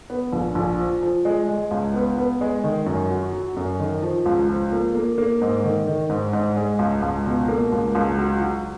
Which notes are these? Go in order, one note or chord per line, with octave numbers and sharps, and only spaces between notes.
B3
A#1
A#1
F3
F3
G#3
G#3
C#2
B3
B3
G#3
D#3
F#2
F#3
F#3
F#2
D#3
F3
C#2
F3
A#3
A#3
A#3
G#2
D#3
D#3
G#2
G#2
G#3
C#2
C#2
B2
A#3
C#2
C#2
F#3
F#3